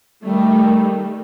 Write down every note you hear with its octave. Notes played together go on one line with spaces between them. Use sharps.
D#3 G3 A3